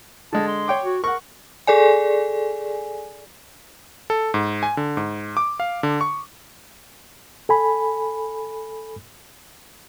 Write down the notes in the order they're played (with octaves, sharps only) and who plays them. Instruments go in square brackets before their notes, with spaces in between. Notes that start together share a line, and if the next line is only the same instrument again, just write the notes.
[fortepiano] D3 G#3 [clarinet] A5
[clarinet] C6
[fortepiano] C#5 G5 D6
[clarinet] F#4
[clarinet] A#4 [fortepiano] F#5 C#6
[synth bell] G#4 A4 D5 G#5
[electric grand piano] A4
G#2
G#5
D3
G#2
D6
F5
D3
C#6
[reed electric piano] A4 G#5 B5